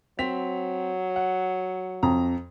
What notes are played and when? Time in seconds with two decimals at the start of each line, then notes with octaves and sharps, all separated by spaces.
0.19 F#3 C4 B6 F7
1.16 F#5
2.03 F2 A#5